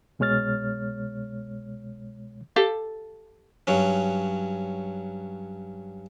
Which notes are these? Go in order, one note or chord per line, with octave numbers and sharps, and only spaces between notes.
C2 B2 G#3 C#5 F6 A6
G4 A4 F5
G2 F#3 C#4